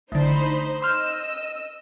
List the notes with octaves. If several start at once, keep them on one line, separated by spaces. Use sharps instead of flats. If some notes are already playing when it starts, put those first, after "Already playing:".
A1 D3 D#4 C5 B5
D#5 C6 E6 F6 G6